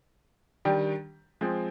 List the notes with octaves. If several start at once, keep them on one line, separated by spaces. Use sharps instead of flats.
D#3 G3 D4 G4
F3 G#3 C4